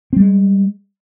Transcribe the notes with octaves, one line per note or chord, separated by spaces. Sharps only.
G3 G#3 C4